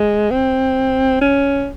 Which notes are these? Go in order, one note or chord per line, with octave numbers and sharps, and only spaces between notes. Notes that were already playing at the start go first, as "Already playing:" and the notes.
Already playing: G#3
C4
C#4